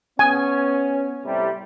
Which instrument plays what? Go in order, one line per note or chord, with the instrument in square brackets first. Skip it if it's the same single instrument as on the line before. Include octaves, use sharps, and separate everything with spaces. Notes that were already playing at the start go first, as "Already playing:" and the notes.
[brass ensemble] B3 C#4 [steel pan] G#5
[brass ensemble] A2 C3 G3